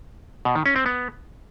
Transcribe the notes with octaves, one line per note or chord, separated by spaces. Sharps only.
B2
D#3
C#4
C4
B3